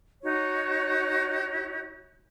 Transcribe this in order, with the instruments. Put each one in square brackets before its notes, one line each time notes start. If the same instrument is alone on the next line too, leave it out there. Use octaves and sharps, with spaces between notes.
[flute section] D#4 F#4 C#5